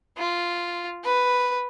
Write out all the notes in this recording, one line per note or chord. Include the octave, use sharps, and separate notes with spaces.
F4
B4